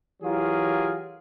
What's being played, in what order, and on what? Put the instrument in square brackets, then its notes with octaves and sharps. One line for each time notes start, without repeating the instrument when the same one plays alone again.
[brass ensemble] E3 F#3 F4 G4 G#4 A#4